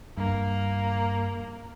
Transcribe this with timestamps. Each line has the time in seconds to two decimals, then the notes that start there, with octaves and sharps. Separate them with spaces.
0.17 G2 A#3